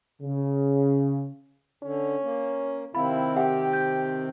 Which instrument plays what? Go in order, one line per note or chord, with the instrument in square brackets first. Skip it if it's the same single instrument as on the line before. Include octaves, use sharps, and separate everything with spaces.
[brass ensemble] C#3
[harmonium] D3 [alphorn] C#4
[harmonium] A#3
[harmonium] C3 D#3 C4 [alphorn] E4 [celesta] F5 B5
[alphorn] G4 [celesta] E5 F#5 G5
[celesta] G6